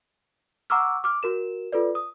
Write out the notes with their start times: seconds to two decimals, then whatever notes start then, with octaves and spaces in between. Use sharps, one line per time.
0.70 F#5 A#5 C#6 D6 E6 F6
1.04 D6 F6
1.23 F#4 A#4 E7
1.72 F4 A4 B4 D5
1.95 D#6